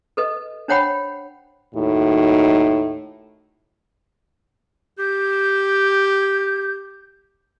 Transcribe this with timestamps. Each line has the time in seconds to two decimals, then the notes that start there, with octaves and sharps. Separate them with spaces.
0.17 A4 B4 D#5
0.68 D4 C5 C#5 F#5 G5 B5
1.75 D#2 A2 D#4 F#4
4.99 G4 G6